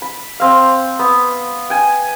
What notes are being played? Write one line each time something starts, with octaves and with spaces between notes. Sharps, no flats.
B5
C4 F5
B3
G5 G#5